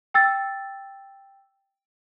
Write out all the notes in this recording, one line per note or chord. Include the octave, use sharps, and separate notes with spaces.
G5 E6 A6